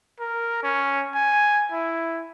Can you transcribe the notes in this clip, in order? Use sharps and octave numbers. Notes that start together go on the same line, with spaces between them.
A#4
C#4
G#5
E4